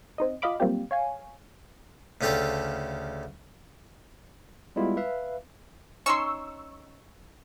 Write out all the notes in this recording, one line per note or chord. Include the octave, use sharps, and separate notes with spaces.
C4 D#4 D#5
F4 D#5 F5 B5 D6
F#3 G3 A#3 C4 F4 G4
C#5 F5 G#5
D2 C#3 F4 G4 A4 D5
G3 G#3 B3 E4 F4
B4 E5 F5
C#4 D#4 C6 C#6 E6